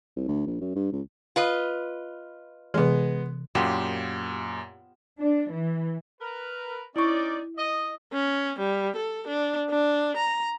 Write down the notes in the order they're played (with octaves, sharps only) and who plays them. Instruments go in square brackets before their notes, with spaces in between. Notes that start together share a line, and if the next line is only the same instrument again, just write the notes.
[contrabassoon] C2
D2
A#1
F#2
G2
C#2
[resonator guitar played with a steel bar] F4 B4 D#5
[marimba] C3 E3 [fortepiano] G#3 B3
[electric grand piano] F#2 A#2 E7 [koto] B3 F4 G4
[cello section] D4
E3
[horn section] A#4 B4
[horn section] C#4 D#4 D5 [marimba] E4 C#6
[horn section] D#5
[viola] C#4
G3
A4
D4
D4
A#5